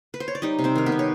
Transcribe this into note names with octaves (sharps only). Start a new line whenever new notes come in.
B4
C5
C#5
D5
G3 D#4 D#5
C3
C4 C5
D#3 A#4
B3 B4
C3
C#5